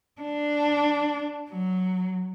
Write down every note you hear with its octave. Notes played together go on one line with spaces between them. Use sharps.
D4
F#3